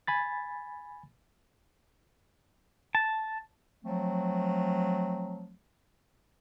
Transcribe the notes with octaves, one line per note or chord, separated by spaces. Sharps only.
G#5 B5 A6
A5
F3 F#3 A3 C4